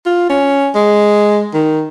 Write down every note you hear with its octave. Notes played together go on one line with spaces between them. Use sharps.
F4
C#4
G#3
D#3